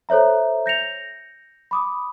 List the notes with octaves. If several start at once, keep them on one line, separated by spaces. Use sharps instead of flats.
A4 C5 C#5 E5 A#5
G6 A#6 C#7 F7
B5 D6 D#6